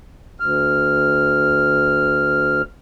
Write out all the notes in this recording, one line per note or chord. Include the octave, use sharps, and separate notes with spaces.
D2 F6